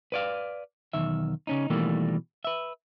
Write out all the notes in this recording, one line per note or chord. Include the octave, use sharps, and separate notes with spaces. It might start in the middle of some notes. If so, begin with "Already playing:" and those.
B4 D5 F5
B1 E2 D#3 E5
C#3 C#4 D#4
B2 D#3 E3 G3 A3 A#3
B4 E5